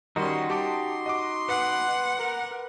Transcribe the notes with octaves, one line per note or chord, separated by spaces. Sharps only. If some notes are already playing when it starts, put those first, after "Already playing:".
D#3 G3 C#4 D#4 F#4 C6
G4 A5 C6 D6
D#5 F#5 D6
B4 F#5 D6
A#4